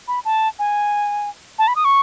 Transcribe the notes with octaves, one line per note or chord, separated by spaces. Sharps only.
B5
A5
G#5
A5
B5
D#6
C#6